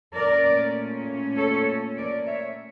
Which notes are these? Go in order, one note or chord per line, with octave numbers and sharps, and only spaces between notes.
A#2 A3 C#4 A#4 D5
A4 C#5
A#4 D5
C#5 E5